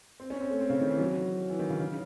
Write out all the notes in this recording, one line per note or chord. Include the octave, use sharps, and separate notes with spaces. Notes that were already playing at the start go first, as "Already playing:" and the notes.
C4
C#4
C4
A3
C4
C#3
D#3
E3
F#3
E3
D#3
C#3
C#3